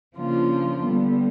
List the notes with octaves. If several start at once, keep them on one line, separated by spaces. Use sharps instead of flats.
C#3 F3 A#3 D4 F4
D3 G3 B3